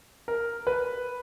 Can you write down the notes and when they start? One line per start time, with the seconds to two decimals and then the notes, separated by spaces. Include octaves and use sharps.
0.28 A#4
0.67 B4